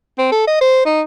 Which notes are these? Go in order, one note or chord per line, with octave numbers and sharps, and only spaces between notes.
C4
A4
D#5
C5
D#4